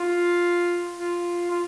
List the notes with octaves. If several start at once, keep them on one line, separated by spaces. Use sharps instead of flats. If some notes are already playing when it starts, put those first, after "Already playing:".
Already playing: F4
F4
F4